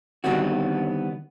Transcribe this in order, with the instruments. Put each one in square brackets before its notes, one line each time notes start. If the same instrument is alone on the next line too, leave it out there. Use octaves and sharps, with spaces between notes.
[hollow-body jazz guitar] D3 D#3 G3 B3 C4 F#4